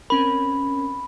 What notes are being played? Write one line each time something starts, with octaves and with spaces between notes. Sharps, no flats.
C4 C#4 A#4 B5